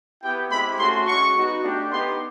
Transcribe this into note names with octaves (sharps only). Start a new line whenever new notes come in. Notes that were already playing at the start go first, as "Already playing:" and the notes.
B3 E4 G4 G5
G#3 C4 E4 G4 B5
A3 C#4 F#4 C6
G#3 C#4 F#4 C#6
B3 D#4 F#4
A3 D4 G4
B3 D#4 G4 C6